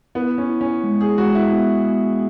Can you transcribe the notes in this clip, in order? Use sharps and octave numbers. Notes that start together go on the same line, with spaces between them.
B3 E4
C#4
E4
C#4
G#3
G#4
G#3 F#4
E4
B3
B3